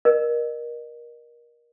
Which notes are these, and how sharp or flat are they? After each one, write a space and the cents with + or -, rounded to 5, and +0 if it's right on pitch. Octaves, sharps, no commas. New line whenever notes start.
A#4 +20 D#5 -35